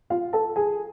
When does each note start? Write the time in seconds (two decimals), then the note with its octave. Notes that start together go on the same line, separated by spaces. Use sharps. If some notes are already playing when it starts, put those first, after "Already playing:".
0.10 F4 F5
0.33 A4 A5
0.56 G#4 G#5